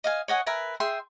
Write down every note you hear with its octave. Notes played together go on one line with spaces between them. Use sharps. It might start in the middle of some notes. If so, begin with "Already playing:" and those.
D#5 F5 G#5
C#5 D#5 F#5 G#5
A#4 B4 E5 G#5
G#4 E5 G5 C6